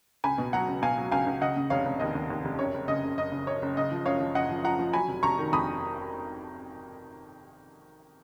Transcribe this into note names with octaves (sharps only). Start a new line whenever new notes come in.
C#2 G#5 B5
B2
F#3 F#5 A#5
C#2
B2 F5 G#5
F#3
C#2 F5 G#5
C#2
C#3 D#5 F#5
C#3
F1 C#5 F5
F1
D#2 D#5
D#2
D#2
F1
F#2 C#5
F#1
C#3 D#5
F#1
F#1 D#5
C#3
F#2 C#5
F#1
C#3 D#5
F3
F#2 C#5 F5
F3
F#1 D#5 F#5
F3
F3 F#5 A#5
F3
F#3 G#5 B5
F1
F1 A#5 C#6
D#3
F2 B5 D#6